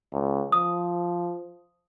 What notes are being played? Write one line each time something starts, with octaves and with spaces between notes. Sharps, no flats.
C#2
F3 D#6